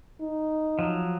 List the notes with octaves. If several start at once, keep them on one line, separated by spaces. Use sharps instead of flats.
D#4
F3 F#3